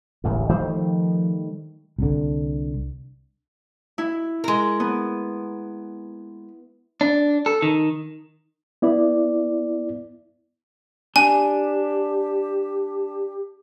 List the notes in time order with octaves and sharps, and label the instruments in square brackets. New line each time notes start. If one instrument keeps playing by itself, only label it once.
[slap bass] D1 A1 D#2
[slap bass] D#3 G3 A3 [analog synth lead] C5
[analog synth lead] F3
[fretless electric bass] C2 D3
[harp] E4
[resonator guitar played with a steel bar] G#3 A#4
[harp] B3
[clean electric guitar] D4
A4
D#3
[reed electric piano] B3 E4 D5
[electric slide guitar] D4 [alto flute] G4 [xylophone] G#5